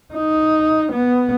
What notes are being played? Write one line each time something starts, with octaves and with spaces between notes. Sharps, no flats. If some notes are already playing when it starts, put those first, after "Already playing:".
D#4
B3